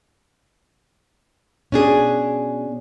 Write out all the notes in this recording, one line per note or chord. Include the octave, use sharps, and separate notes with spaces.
B2 C#4 D4 G#4